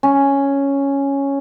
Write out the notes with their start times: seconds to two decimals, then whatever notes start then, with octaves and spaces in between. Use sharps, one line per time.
0.03 C#4